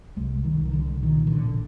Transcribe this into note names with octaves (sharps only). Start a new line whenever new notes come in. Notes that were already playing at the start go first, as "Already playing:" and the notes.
C2 G#3
C2 D#3
D#3
C2 D3
A#2 D#3
D#3
A1 D3